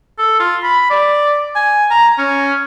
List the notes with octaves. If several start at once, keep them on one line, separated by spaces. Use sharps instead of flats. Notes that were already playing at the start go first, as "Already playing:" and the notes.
A4
F4
B5
D5
G#5
A#5
C#4